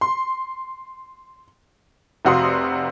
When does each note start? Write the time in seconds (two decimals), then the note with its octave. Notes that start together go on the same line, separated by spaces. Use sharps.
0.01 C6
2.25 F1 C3 F#4 F5 C6 D#6